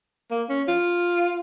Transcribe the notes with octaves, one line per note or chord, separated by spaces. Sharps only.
A#3
C#4
F4